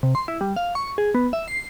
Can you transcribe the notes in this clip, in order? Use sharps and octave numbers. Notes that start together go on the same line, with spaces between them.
C3
C6
E4
G3
F5
C#6
G#4
B3
E5
C7